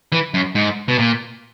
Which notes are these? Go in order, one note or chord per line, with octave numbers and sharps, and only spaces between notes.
E3
F#2
G#2
B2
A#2